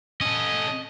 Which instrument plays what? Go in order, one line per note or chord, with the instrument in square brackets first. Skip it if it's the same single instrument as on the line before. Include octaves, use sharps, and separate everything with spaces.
[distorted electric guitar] C#4 A4 [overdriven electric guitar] D#5